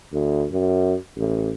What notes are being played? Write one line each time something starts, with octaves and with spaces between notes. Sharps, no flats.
D2
F#2
A1